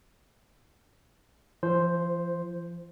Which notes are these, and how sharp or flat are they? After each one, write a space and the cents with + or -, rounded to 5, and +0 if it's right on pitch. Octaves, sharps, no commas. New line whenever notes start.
F3 -35 C5 +0